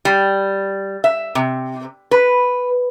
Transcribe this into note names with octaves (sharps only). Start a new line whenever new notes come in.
G3
E5
C3
B4